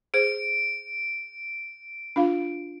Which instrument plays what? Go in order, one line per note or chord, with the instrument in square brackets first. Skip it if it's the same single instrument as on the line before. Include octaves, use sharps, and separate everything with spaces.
[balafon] G#4 C5 [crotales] D7
[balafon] D4 F4 F5